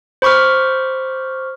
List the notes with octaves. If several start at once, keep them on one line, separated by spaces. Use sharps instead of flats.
C5 B5 C#6 D6 F6